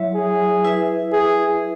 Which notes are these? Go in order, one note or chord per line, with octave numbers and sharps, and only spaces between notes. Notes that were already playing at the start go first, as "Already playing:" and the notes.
Already playing: F#3 E4 C#5 E5
G#4
E4 B4 E5
G#4